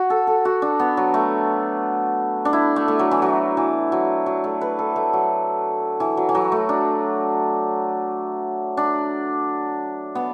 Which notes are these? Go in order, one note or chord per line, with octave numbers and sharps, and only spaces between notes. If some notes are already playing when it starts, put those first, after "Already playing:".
Already playing: F#4
A4
A4
F#4
D4
B3
F#3
A3
D4
E4
A3
A3
F#3
E3
F#3
E3
F#3
F#3
A3
B4
A4
A3
F#3
E3
F#3
E3
F#3
A3
D4
D4
B3